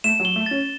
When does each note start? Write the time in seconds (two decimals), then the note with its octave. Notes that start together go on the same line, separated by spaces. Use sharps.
0.04 A3 E7
0.20 F#3
0.25 G7
0.36 A3
0.46 C#4 A6